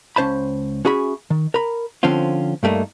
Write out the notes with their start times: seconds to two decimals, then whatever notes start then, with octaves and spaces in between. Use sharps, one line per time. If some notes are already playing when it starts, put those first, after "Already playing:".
0.16 C#2 C#4 C5 A5 B5
0.85 C#4 F#4 G#4 E5 B5
1.30 D#3
1.54 A#4 B5
2.03 D3 F3 C4 C#4 F4
2.63 G2 G3 A3 A#3 D#4